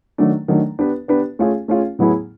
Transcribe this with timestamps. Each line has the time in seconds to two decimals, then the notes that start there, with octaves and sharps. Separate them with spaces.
0.18 D#3 F#3 A3 D4
0.48 D#3 F#3 A3 D4
0.79 B3 D4 G4 B4
1.08 B3 D4 G4 B4
1.39 A3 C#4 F4 G#4
1.68 A3 C#4 F4 G#4
1.99 A2 F#3 B3 E4 G#4